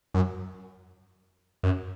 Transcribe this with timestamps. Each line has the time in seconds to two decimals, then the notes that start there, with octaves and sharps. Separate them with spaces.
0.14 F#2
1.63 F#2